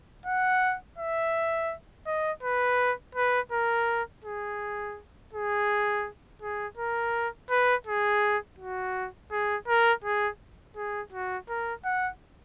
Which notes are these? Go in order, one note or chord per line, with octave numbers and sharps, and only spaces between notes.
F#5
E5
D#5
B4
B4
A#4
G#4
G#4
G#4
A#4
B4
G#4
F#4
G#4
A#4
G#4
G#4
F#4
A#4
F#5